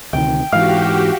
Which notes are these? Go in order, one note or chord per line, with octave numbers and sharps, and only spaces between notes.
D2 C3 D#3 G5
G#2 E3 F#4 G4 F5